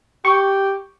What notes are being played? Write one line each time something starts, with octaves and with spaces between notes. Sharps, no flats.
G4 C#6